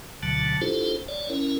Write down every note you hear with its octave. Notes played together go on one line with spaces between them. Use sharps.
D2 B2 D3 F#3 A5
D4 E4 F4 G4 A4 C5
C#5 D5
C#4 E4 A#4